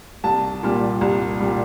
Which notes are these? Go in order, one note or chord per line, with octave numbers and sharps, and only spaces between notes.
C2 A5
A#2 G3
C2
A#2 G3